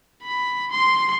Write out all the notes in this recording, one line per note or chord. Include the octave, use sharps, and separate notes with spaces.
B5
C6